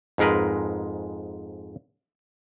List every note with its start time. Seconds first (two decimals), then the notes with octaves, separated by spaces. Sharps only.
0.18 F2 G#2 G#3 A#4 B4